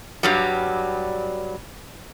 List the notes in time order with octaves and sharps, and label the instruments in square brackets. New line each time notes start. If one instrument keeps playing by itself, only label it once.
[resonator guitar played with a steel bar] G2 F#3 G3